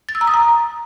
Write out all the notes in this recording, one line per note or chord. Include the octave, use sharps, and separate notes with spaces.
A6
E6
A#5
D#6
A#5